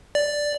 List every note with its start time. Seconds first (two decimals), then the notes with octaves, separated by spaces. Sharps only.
0.15 D5